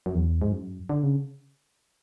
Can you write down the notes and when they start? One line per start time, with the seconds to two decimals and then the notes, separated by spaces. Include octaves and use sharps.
0.06 F#2
0.15 E2
0.42 G#2
0.52 F#2
0.89 D3
1.03 C#3